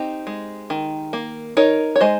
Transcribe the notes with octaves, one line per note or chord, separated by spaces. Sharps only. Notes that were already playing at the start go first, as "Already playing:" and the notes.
Already playing: C4 D#4 G4
G#3
D#3
A#3
D#4 A#4 C#5
C#5
G#3 C5 D#5